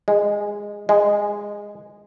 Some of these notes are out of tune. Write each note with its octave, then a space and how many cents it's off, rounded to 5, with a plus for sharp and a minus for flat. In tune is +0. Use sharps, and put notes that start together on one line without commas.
G#3 -15
G#3 -15